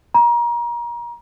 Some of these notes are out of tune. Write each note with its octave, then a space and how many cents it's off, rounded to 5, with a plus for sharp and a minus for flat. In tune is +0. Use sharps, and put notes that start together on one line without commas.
A#5 +30